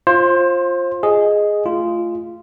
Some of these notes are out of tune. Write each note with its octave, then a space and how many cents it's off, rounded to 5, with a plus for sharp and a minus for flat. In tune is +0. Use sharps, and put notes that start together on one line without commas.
F4 +0 C5 +25
G#4 +0 D#5 +0
A3 +0 F4 -15